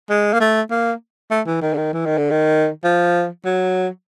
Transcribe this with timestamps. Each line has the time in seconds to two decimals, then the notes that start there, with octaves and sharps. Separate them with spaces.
0.10 G#3
0.33 A#3
0.40 A3
0.71 A#3
1.31 A3
1.46 E3
1.61 D#3
1.74 D3
1.77 D#3
1.93 E3
2.06 D#3
2.18 D3
2.31 D#3
2.84 F3
3.45 F#3